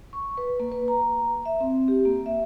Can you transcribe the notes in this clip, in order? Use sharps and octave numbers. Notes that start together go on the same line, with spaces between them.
C#6
B4
A#3
B4
A#5
E5
C4
G4
A#3
E5